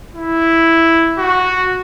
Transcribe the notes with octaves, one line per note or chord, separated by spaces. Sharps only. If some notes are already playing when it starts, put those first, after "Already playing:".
E4
F#4